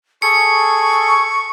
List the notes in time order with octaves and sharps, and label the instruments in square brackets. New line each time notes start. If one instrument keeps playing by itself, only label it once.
[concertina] G#4 A4 [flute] C#6 [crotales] C#7